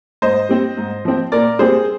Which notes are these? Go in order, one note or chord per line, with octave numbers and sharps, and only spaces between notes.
G#2 C5 D#5
G3 C4
G#2
F3 C4
A#2 A#4 D5
G3 C4 G#4 C5